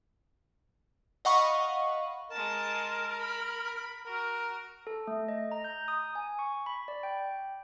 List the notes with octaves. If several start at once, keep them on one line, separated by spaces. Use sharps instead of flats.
D#5 F5 F#5 B5 C#6
G#3 A#4 A5
B5
F#4 A#4
A4
A3
D#5
A#5
G6
D#6
G#5
C#6
B5
D5
G5